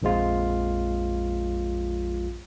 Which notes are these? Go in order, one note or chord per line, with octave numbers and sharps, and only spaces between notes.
A#1 F2 F3 G#3 F4